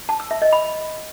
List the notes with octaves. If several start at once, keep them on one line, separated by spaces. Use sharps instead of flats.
A5
E6
E5
D#5
B5